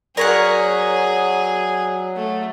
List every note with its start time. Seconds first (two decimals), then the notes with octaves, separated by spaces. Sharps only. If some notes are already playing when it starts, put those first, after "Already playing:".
0.17 F#3 G#4 A#4 C#5 D5 F#5 B6
2.16 A3